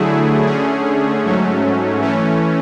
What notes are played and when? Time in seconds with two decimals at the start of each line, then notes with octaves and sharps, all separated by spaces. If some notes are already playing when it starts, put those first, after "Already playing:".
Already playing: D3 F#3 A3 E4 G#4
0.46 D3 A3 C#4 G#4
1.23 G#2 F#3 A3 C#4
1.99 E3 A3 C#4